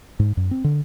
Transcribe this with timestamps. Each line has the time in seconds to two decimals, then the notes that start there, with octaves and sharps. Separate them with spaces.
0.19 G#2
0.37 F#2
0.51 C4
0.64 D3